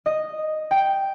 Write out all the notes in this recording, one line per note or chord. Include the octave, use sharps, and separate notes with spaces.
D#5
G5